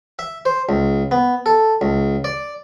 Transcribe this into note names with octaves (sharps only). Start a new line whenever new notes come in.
E5
C5
C#2
B3
A4
C#2
D5